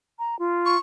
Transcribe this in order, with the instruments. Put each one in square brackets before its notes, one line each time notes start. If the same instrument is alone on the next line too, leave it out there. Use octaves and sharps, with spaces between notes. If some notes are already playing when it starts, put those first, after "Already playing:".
[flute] A#5
F4
[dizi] C#6